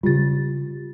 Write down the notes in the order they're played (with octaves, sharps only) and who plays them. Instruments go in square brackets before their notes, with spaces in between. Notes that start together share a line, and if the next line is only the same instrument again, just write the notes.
[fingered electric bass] C#3 G3 [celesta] F4 G4 A6